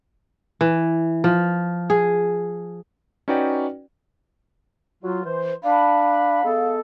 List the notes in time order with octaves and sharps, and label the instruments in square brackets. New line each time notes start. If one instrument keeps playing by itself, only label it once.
[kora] E3
F3
G#4
[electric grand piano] C#4 D#4 F#4 B4 D5 G5
[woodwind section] F#3 F4
E3 C5
[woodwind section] D4 B5 [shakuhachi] F5
[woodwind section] G#3 B3 A4